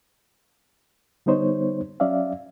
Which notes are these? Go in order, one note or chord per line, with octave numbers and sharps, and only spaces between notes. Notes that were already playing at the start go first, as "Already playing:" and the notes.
D3 G3 B3 D#4 C5 C#5
F#3 C#4 D5 E5 F5